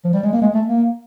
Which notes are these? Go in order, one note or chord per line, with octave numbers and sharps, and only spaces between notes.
F3
G3
G#3
A#3
G#3
A3
A#3